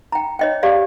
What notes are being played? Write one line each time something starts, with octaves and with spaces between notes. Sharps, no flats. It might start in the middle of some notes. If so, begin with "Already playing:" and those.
G5 A#5
C#5 D#5 G5
G4 G#4 D5 F5